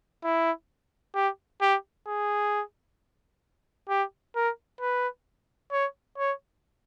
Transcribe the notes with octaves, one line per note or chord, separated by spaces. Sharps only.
E4
G4
G4
G#4
G4
A#4
B4
C#5
C#5